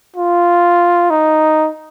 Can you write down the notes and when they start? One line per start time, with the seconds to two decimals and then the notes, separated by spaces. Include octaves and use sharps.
0.16 F4
1.10 D#4